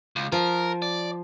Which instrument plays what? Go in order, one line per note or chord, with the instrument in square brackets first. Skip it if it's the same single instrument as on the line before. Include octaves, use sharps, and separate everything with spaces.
[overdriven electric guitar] C#2
[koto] F3 [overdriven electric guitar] A#4
[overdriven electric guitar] D5